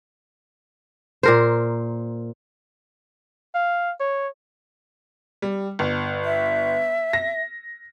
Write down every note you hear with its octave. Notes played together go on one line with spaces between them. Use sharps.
A#2 A#4 C5
F5
C#5
G3
G1
E5
A#6